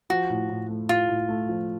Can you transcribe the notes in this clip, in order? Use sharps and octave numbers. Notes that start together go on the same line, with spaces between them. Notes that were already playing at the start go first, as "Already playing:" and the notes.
F3 F#4
A2
A2
A3
A2 F4
A2
A3
F3